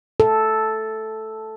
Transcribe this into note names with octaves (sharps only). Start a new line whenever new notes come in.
A4